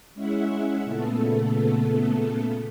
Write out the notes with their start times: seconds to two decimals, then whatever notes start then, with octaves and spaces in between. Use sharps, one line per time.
0.14 G#3 C#4 E4 E5 F#5
0.84 A#2 C#3 A3 B3 A4